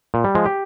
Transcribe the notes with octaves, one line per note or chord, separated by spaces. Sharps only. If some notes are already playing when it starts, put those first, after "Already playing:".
A#2
G3
F3 G#3
G4